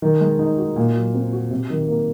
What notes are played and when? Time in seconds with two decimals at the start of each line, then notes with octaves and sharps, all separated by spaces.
0.02 D#3
0.21 G#3
0.39 D#4
0.58 F#4
0.76 A#2
0.95 F#3
1.14 C4
1.33 F#4
1.51 C3
1.70 D#3
1.88 A#3